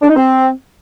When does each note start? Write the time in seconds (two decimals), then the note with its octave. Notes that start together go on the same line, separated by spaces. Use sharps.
0.02 D4
0.09 D#4
0.16 C4